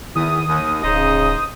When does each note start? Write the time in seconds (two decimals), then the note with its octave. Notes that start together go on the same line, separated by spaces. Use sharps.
0.16 E2 D#3 D#6
0.48 D#2
0.83 D1 C#3 D#4 C5 D#5